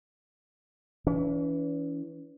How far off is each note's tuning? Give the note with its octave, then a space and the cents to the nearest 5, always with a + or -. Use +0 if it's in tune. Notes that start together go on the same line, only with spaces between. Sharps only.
E3 +0 C#4 +40